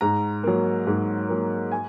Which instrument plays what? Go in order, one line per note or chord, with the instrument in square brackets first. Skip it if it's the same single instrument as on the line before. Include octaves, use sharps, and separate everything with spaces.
[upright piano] G#2 A#5
F#3 A#3
G#2
F#3 A#3
G#5